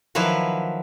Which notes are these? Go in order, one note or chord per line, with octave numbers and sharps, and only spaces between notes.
D#3 F3 F#3 E4 B4